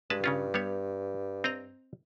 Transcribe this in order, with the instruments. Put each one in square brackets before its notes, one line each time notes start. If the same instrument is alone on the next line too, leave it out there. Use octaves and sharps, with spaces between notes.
[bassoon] G2 [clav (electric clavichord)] G#3 B4 A5
[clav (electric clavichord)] C#3 C#4 F4
G3 B3 C#5
C4 D#5 A#5